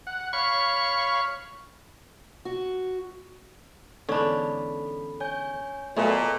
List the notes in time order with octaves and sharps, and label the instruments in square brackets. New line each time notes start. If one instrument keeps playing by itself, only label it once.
[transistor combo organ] F#5
[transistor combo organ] C#5 F5 B5 [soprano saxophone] C#6
[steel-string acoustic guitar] F#4
[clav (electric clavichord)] E2 G#2 D3 [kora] C#4 D4 [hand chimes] A4 B5
[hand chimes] C#5 G#5 G6
[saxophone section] A#2 [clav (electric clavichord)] F#3 B3 G#4 [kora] A3 [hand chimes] B4 D#5